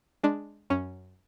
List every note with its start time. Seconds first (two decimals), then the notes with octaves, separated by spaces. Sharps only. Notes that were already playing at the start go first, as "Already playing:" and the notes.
0.24 G#3 D4
0.70 F#2 C#4